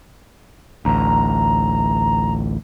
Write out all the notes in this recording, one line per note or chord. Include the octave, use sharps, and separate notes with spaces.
A1 D2 A#5